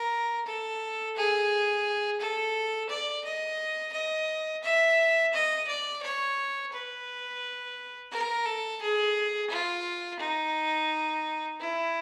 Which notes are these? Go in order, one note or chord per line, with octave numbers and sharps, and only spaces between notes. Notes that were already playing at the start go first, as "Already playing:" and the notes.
Already playing: A#4
A4
G#4
A4
D5
D#5
D#5
E5
D#5
D5
C#5
B4
A#4
A4
G#4
F4
D#4
E4